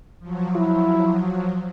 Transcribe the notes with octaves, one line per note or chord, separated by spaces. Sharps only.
F3 F#3
E4